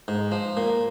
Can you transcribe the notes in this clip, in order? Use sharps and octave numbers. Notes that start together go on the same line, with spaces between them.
G#2
F3
A#2